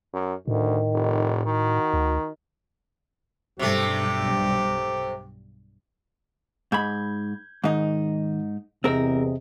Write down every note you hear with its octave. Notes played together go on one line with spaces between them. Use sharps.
F#2
D2 A2 D#3
F1
D#3 F#4
D2
B1 G2 C3 G3 A3 G4
G#2 B5 G6 G#6
G#2 D#3 D#4
E2 C3 C4 G#4 A#4 D#5